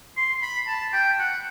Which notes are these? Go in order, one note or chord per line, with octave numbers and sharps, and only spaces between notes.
C6
B5
A5
G5
F#5